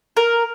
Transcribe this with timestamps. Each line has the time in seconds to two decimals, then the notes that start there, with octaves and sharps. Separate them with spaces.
0.17 A#4